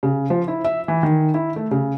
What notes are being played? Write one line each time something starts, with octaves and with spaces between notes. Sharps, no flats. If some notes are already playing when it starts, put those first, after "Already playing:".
C#3
F3
E4
E5
E3
D#3
E4
A3
C#3